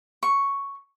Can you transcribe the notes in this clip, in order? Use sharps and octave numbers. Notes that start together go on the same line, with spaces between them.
C#6